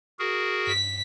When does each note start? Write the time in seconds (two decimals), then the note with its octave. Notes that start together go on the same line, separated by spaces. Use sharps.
0.19 F#4 G#4 A#4
0.67 G2 B6